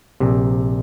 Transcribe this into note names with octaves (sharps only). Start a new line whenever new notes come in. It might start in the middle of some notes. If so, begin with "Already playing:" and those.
A#1 C3